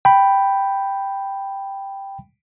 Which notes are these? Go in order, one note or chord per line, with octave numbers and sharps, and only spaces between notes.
G5 B5